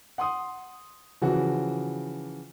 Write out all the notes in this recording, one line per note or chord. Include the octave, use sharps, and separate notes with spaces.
F#5 C6 D#6
C#3 E3 F3 F#4